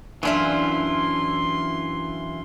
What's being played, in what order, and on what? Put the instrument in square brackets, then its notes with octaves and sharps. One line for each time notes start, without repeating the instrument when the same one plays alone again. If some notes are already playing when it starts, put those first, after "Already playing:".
[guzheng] F#2 D4 E5 [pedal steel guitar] E3 E4 F4 [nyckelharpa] C6